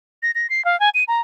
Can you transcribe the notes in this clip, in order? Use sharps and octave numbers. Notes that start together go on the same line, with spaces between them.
A#6
A#6
C7
F5
G#5
D#7
A#5